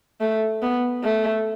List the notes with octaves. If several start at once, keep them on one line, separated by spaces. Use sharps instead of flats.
A3
B3
A3